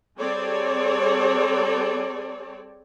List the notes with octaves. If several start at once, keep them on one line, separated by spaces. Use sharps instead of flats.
G3 C4 G#4 A4 C#5 D5